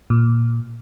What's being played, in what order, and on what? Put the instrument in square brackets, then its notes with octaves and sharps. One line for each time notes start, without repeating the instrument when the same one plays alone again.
[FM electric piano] A#2